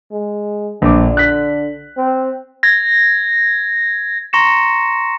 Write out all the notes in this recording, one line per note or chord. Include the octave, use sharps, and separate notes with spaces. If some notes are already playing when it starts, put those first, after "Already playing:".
G#3
A#1 D3 D6
F#6 B6
C4
G#6 A#6
A#5 C6 C#6 A#6 C#7 E7